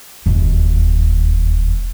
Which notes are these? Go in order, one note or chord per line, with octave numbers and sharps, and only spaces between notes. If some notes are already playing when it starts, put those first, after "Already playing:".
E1 D#2